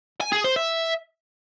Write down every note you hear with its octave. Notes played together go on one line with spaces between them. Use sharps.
G#5
G#4
C5
E5